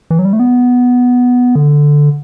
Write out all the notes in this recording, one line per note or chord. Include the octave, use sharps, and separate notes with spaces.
E3
F#3
G3
A3
B3
D3